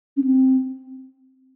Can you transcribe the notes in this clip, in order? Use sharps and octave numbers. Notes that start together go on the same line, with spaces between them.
C#4
C4